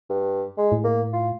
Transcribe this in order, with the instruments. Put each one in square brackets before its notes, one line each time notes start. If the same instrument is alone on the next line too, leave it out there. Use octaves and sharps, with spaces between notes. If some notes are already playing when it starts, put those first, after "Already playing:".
[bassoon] G2
G#3
[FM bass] A2
[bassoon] A#3
F4